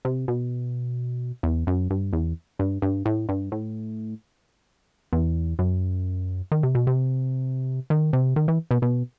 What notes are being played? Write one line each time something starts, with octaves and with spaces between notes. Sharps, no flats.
C3
B2
E2
F#2
G2
E2
G2
G2
A2
G2
A2
E2
F#2
D#3
C3
B2
C3
D#3
C3
D#3
E3
B2
B2